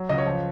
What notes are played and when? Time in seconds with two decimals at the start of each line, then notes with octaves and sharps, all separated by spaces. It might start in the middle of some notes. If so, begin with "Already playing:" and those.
Already playing: F#3
0.09 C#2 D#5
0.18 C#5
0.26 F3